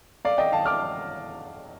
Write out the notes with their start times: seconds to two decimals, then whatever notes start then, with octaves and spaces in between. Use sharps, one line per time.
0.25 D5 F5
0.38 D#5 G5
0.52 F5 A5
0.65 D6 F6